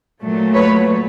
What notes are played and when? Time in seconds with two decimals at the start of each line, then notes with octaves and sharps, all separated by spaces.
0.22 A#2 F#3 A3
0.54 B4 C#5